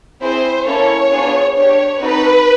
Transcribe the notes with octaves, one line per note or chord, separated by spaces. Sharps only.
C4 E4 G#4 C5
A#3 C#4 E4 A4 C#5
B3 D4 F4 G#4
D4 G4 C#5
C4 D#4 F#4 A4 B4